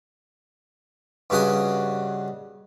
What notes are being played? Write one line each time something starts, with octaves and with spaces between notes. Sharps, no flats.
G2 C#3 F#4 D#5 G#5